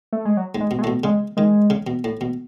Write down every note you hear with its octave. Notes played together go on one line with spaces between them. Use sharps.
A3
G#3
F#3
G#2
G#3
B2
G#3
A2 A3
B2
C#3 G#3
D#3 G#3
C#3
B2
A2
B2